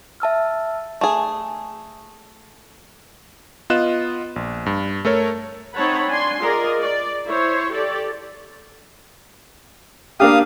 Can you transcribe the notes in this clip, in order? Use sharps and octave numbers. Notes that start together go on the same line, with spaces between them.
E5 A5 E6 F6
A3 G#4
B3 F4 D#5 F#6 E7
A#1
G2
A3 A4 A#4 C#5
C4 D#4 C#5 F#5 A5 B5
D4 G#5 C6
F4 G#4 A#4 D5 D#5
D5
E4 C5 C#5
G4 A4 D5
A#3 D4 G4 F5 D#6